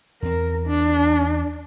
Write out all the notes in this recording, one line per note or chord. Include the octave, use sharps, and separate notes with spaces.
E2 C4 A#4
D4